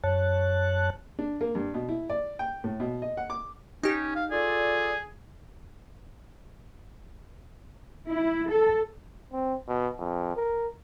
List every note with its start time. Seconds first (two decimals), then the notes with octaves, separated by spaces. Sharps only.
0.04 F#2 C#5 A5 F#6
1.19 D4
1.41 A#3
1.55 G2
1.74 B2
1.89 E4
2.10 D5
2.39 G5
2.64 A2
2.80 B2
3.02 D#5
3.17 F#5
3.30 D6
3.83 C#4 D#4 G4
4.16 F5
4.31 F4 G#4 A4 D5
8.11 E4
8.50 A4
9.32 C4
9.68 B2
9.99 F2
10.36 A#4